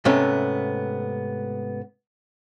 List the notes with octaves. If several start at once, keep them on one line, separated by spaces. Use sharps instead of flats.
G#2 C3 A3 B3 C#4